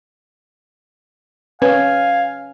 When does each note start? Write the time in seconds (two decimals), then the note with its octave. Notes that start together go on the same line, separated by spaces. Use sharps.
1.62 C#4 B4 F5 G#5